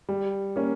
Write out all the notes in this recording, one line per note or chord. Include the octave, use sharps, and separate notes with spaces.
G3
A#3 C#4